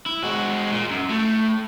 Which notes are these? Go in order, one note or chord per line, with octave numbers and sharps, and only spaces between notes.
E4
G#3 F#4
A#2
F#2
A2